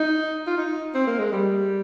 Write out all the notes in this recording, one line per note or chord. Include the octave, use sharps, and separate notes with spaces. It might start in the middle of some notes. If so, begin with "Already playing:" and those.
Already playing: D#4
F4
D#4
C4
A#3
G#3
G3